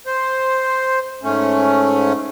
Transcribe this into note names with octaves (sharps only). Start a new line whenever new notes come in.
C5
G#2 A3 C#4